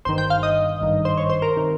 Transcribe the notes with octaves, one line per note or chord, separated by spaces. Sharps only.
G1 G2 D#3 C5
G5
F5
D#5
G#1 G2 D#3
C5
C#5
C5
A#4
C3 D#3